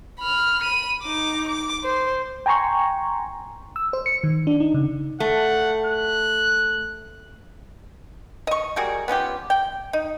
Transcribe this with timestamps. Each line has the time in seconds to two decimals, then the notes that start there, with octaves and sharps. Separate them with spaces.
0.20 B5 F6
0.62 B5 D#7
1.03 D#4 D6
1.48 D6
1.84 C5
2.46 G5 G#5 A#5 C6 C#6
3.76 E6
3.93 C5
4.06 C#7
4.24 D#3
4.47 D4
4.60 D#4
4.74 C#3
5.20 A3 F#5
5.86 F#6
8.47 D#5 C#6
8.76 G3 A#3 F#4 G#4
9.08 B3 C#4 F4 G4
9.50 G5
9.93 D#4